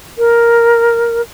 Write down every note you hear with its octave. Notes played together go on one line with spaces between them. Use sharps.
A#4